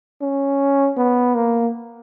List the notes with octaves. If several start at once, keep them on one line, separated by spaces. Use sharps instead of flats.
C#4
B3
A#3